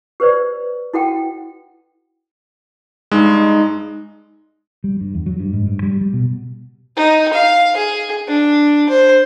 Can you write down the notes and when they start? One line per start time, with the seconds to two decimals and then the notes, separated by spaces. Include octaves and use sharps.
0.20 G4 B4 C5 D5
0.94 E4 F#4 A4 F#5 G5
3.11 G2 G#3 D#4
4.84 G3
5.00 G2
5.15 E2
5.26 F#3
5.40 G2
5.53 G#2
5.67 G2
5.83 G3
6.01 G3
6.13 B2
6.96 D#4
7.33 F5
7.77 G#4
8.28 D4
8.89 C5